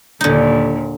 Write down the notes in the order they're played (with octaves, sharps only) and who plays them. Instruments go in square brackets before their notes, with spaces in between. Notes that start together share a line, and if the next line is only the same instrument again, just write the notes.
[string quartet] D#2 A#2 [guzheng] D3 D#4